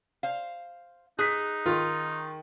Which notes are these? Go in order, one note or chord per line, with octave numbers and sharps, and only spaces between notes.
C5 F5
D#4 G#4 F#6 B6
D#3 F4